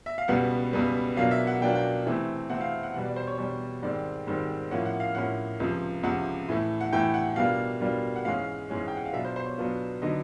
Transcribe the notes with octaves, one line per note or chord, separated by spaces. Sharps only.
E5
F5
C#2 B2 G3 B3 F#5
C#2 B2 G3 B3
B2 F#3 A#3 D4 F4 F5
E5
F#5
B2 F#3 A#3 D4 F4 G5
G5
C3 E3 A3 C4
C3 E3 A3 C4 F#5
F5
F#5
E2 B2 G3 F#5
D5
C5
C#5
E2 B2 G3 C#5
G#2 D#3 G3 C4 D5
G#2 D#3 G3 C4
A2 F3 A#3 C#4 F#5
F#5
F5
A2 F3 A#3 C#4 F#5
C#2 C3 F3
C#2 C3 F3 F#5
A2 E3 A3
F#5
A2 E3 A3 G5
F#5
B2 G3 A#3 D4 F4 F5
B2 G3 A#3 D4 F4
F#5
G#2 E3 G#3 C#4 F5
G#2 E3 G#3 C#4
G5
F#5
F5
B2 F#3 B3 D4 F4 E5
C5
C5
C#5
B2 F#3 B3 D4 F4
D3 F#3 B3 D#4 D#5